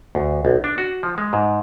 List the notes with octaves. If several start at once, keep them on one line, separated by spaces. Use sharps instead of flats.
D2
B1
D4
F#4
F3
G#3
G#2